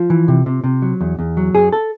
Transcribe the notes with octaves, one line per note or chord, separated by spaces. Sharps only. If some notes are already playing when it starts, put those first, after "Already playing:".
Already playing: F3 F4
E3
C3
C3
C3
F#3
E2
E2
F#3
F#2 G#4
A4